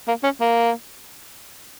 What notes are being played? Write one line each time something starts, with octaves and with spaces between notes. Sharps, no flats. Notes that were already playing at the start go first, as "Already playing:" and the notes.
A#3
C#4
A#3